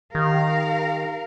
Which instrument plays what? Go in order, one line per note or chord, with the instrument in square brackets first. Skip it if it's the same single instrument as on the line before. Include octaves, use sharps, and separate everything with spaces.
[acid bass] D#3 [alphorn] G4 [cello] A#4 F5